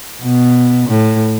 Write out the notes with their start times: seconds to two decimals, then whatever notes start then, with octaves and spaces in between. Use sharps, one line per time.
0.22 B2
0.89 A2